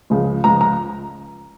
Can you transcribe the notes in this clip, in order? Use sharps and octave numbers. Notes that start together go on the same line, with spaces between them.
C#2 C#3 F3
C#2 C#3 F3 A#5
A#5